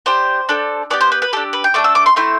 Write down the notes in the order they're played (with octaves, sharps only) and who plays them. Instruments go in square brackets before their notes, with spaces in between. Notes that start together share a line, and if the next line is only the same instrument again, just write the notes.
[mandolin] D4 G4 C5
D4 A4
B3 D4 G4 D5
C5
B4
B4
D4 G4 A4
B4
G5
A3 D4 A4 D6
E6
D6
C6
A3 C4 E4 C6